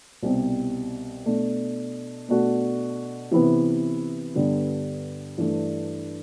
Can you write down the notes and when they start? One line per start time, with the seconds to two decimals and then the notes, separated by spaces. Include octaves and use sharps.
0.23 C2 B2 G3 C4
1.26 B2 A3 D4
2.29 B2 A3 D4 F#4 A4
3.31 C3 E3 B3 E4 B4
4.35 G2 D3 G3 B3
5.38 G2 E3 A3 D4